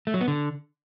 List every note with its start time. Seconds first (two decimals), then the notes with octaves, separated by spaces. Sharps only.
0.07 A3
0.14 F#3
0.21 B3
0.28 D3